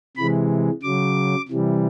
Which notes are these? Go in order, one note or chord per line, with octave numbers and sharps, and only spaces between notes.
C3 E3 G#3 B5
C#3 F#3 D6
C3 E3 G3